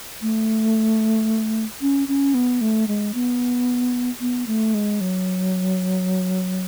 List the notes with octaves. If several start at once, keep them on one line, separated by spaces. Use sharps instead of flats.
A3
C#4
C#4
B3
A3
G#3
B3
B3
A3
G#3
F#3